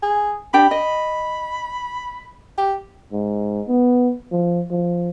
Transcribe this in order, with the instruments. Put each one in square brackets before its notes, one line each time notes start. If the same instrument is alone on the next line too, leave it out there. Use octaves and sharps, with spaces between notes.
[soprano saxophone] G#4
[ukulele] D4 G4 G5 [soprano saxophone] B5
[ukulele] D#5
[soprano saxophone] G4
[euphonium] G#2
B3
F3
F3